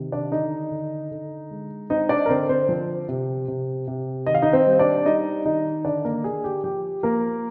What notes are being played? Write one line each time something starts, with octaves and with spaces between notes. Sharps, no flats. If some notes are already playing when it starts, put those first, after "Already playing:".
Already playing: C3 D#3
D4 D5
D3 D#4 D#5
D3
D3
G#3
C4 D#4 D#5
D4 D5
A#4
D3 C4 C5
C4 C5
F3
C3
C3
C3
D#3 D#5
F5
D#4 D#5
C4 C5
G3
D4 D5
G3 D#4 D#5
D#3 D#4 D#5
D3 D4 D5
A#3 A#4
D3 G#4
G4
F3 G4
F3 A#3 A#4